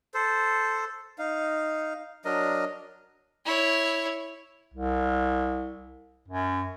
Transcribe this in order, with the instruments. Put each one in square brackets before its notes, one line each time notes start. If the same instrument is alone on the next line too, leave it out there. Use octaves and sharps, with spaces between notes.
[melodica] A4 C5
D#4 F5
F#3 D4 A#4 D#5
[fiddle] E4 C#5
[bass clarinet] C2
F#2